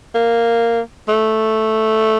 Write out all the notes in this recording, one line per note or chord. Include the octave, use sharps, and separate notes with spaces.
A#3
A3